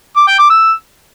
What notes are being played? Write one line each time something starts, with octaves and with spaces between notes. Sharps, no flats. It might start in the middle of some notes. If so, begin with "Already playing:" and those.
D6
G5
D6
E6